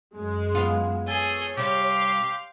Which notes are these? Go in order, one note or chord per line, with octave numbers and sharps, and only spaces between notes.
F#2 G#3
B3 F4
G#4 A4 C#5 G6
C3 G3 G4 F5 C6